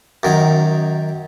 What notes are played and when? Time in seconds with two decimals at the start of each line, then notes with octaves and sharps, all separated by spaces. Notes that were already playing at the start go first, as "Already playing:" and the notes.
0.23 F#2 D#3